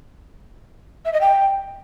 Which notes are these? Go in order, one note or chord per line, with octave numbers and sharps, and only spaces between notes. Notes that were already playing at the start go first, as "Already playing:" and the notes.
E5
D#5
G5